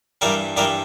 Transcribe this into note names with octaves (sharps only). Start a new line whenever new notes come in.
G2 E3 G3 A#4 D5
G2 E3 G3 A#4 D5